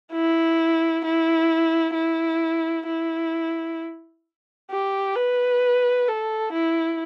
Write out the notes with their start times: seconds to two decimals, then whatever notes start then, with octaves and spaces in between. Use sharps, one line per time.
0.12 E4
1.04 E4
1.95 E4
2.87 E4
4.71 G4
5.16 B4
6.08 A4
6.53 E4